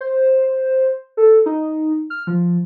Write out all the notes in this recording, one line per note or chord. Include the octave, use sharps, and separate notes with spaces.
C5
A4
D#4
F6
F3